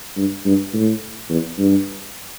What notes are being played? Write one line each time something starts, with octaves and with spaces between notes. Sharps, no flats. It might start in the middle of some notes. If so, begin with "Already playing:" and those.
G2
G2
A2
E2
G2